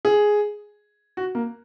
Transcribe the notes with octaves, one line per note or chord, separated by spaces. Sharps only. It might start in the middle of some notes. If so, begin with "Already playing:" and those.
G#4
F#4
A#3